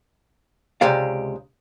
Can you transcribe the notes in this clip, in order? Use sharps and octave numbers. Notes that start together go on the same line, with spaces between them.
C#2 C3 G#3 G4 D5 F5